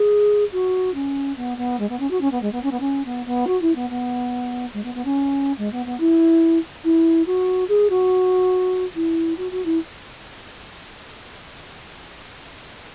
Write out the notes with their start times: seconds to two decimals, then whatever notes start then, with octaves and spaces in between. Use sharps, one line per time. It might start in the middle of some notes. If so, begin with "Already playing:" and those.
Already playing: G#4
0.52 F#4
0.94 C#4
1.37 B3
1.57 B3
1.79 G#3
1.89 B3
2.00 C#4
2.11 F#4
2.21 C#4
2.31 B3
2.42 G#3
2.52 B3
2.63 C#4
2.71 B3
2.80 C#4
3.05 B3
3.26 B3
3.47 F#4
3.61 E4
3.75 B3
3.90 B3
4.73 G#3
4.84 B3
4.95 B3
5.05 C#4
5.58 G#3
5.72 B3
5.86 B3
6.00 E4
6.84 E4
7.26 F#4
7.68 G#4
7.90 F#4
8.95 E4
9.38 F#4
9.52 F#4
9.65 E4